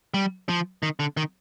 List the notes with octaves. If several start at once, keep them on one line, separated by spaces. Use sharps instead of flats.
G3
F3
D#3
D3
D#3